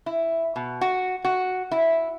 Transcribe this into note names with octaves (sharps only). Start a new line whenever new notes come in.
E4
B2
F#4
F#4
E4